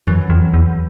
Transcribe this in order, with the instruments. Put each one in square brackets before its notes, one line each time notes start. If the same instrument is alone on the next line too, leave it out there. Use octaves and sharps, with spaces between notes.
[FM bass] F#2 [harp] E3 F#3
[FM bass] F2
E2